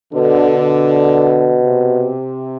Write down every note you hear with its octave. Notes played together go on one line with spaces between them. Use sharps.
B2 D3
C3